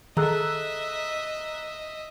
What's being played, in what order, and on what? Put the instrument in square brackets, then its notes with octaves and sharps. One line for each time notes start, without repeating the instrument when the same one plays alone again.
[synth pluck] D#3 [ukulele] G#4 A4 [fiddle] D#5 E5 [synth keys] A#5 E6 F#6